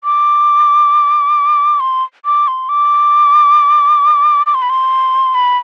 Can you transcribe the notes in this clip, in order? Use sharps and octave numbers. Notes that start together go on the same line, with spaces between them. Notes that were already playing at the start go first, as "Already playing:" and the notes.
D6
C6
D6
C6
D6
D6
C6
B5
C6
B5